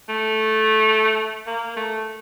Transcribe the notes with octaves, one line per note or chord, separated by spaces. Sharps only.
A3
A#3
A3